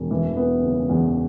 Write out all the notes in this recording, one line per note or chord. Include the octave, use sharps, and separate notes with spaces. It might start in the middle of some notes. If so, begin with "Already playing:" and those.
Already playing: E1
E3
B3
C#3
E2